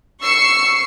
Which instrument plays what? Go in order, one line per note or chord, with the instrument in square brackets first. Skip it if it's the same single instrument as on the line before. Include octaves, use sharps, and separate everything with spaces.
[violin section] C#6 E6 C7 C#7